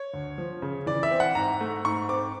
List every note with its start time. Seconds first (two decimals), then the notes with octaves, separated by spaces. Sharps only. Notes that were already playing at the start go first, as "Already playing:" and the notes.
Already playing: C#5
0.14 D2
0.38 F3
0.62 C#3
0.86 E3 D5
1.03 E5
1.11 C4
1.20 F#5
1.35 G#2 A#5
1.60 A3
1.85 G#2 C#6
2.09 C4 D6